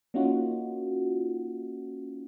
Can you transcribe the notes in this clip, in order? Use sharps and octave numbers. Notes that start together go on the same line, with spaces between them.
A#3 C#4 D#4 F4 F#4